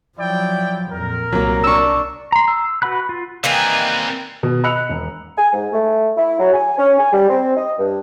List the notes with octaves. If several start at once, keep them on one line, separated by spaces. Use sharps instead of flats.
F3 F#3 E4 D5 G5
F2 A#2 A#4
C2 F#3 A#3
D4 C#6 E6
A#5 C6
E6
F#4 B4 F#5 B5 F#6
F4
D#3 E3 G3 A#3 C4 G#5 F#6
B2
D#5 B5 E6 F#6 C#7 F7
E1
G#5
G#2
A3
E4
F#3
G#5
C#4
G#5
G3
C4
D#5
G2